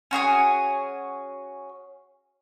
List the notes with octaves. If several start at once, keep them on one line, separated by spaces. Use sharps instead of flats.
C#4 F#4 G#4 G#5